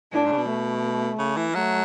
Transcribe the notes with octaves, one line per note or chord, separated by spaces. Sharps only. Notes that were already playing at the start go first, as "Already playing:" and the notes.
A2 D4
G#2
C#3
B2
A3
C#3
E3
F#3 A3